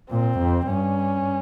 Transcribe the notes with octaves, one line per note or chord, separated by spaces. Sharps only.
A#2 C4
F2
G2 C#4